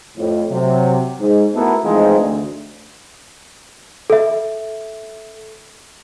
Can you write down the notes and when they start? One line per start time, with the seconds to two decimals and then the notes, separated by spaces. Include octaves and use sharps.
0.17 F2 A2
0.51 C3 F#3
1.21 G#2
1.55 A3 B3 E4 F#4 A4 A#4
1.84 E3 F3 G#3 A3 C4 D#4
2.18 D2
4.10 A4 E5